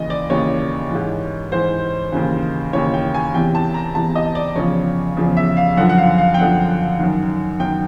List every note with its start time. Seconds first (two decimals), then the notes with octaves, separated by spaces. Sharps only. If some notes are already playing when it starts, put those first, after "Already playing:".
Already playing: D#2 C#3 E3 D#5
0.10 D5
0.30 D#2 C#3 E3 C#5
0.91 G#2 E3
1.52 G#2 E3 C5
2.12 D#2 C#3 E3
2.73 D#2 C#3 E3 C#5
2.94 G5
3.14 G#5
3.34 E2 C3 E3 G5
3.55 A5
3.74 A#5
3.95 E2 C3 E3 A5
4.15 D#5
4.35 D5
4.55 E2 C#3 F3 C#5
5.17 E2 C#3 F3
5.37 E5
5.57 F5
5.77 F#2 D3 F3 F#5
5.89 F#5
5.98 F5
6.18 F5
6.34 G5
6.38 F#2 D3 F3 F#5
6.99 F#2 D#3
7.60 F#2 D#3 G5